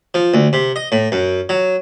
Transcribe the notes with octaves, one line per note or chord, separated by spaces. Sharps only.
F3
D2
C3
D#5
A2
F#2
F#3